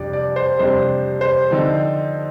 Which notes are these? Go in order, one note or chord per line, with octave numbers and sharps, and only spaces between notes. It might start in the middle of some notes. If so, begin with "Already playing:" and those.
Already playing: F2 C3 G3 D4 D5
D5
C5
F2 C3 G3 D4 C5
C5
D3 F3 C4 D#4